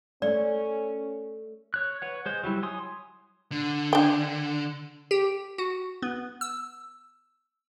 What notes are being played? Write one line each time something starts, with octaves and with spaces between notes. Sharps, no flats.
A3 C#4 D5
C#5 F#6
B4 C#5 F#5
G#3 C5
F#3 G3 E4
C#5 G#5 C6 D#6
D3
D4 G5
G4
F#4
B3
E6